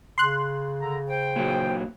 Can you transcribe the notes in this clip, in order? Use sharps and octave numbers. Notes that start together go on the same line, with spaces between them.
C#3 C6 F#6
D3 A#5
C5 G5
A#2 F#3